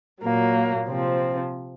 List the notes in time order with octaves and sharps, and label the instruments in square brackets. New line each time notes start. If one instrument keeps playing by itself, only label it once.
[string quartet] A#2 F#3 A#3
C3 F3 C4